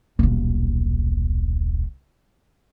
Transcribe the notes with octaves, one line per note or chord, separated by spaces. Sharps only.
D#1 B1